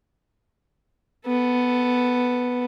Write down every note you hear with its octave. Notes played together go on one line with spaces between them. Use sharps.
B3 A4